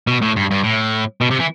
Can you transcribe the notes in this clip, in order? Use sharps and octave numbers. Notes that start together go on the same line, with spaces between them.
B2
A2
G2
G2
A2
B2
C3
E3